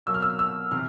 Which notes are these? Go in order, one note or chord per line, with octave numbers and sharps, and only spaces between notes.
B2 F#3 A#3 E6
F6
E6
E6
C3 E3 F6